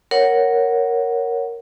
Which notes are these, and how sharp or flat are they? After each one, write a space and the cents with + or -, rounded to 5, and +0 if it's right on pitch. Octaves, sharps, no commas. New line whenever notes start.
A#4 +0 C#5 +0 F#5 +0